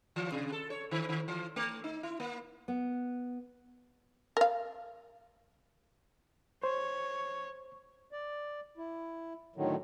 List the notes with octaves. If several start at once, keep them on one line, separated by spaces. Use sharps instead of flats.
E3
C3
A4
C#5
D#3
D#3
E3
A3
D#4
E4
A#3
B3
A#4 F5
C5 C#5
D5
E4
A2 D3 D#3 F#3